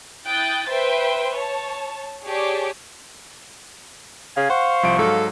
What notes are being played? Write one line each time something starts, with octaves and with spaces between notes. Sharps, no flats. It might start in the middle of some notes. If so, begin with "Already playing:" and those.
E4 G5 D#6 F#6 G6 A6
B4 C5 E5 G5 C6
C#5 A5
G4 G#4 C#5 D5 A5 D6
C#3 F5 G#5
C5 F#5 C#6
C2 F3 D7
G#2 F#3 A4